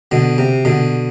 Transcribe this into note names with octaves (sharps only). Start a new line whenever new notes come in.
B2 D3
C3
B2 D3